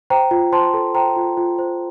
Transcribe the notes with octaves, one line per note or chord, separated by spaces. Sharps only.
C5 G5 A#5
F4
C5 A5 C6
A4
C5 G5 A#5
F4
F4
C5